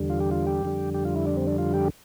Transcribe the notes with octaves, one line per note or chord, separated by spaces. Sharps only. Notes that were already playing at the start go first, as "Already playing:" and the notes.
Already playing: E2 D3 G3
F4
G4
F4
G4
F2 D3 G3
G4
F4
E4
D4
C4
D4
F4
G4